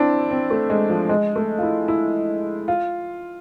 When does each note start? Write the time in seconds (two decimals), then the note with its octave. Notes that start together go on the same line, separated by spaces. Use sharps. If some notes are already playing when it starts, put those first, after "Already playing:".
Already playing: C4 D4 E4
0.31 C4
0.50 A3
0.70 G#3
0.90 F3
1.09 G#3
1.36 A3
1.58 F4
1.63 E4
1.88 E4
2.68 F4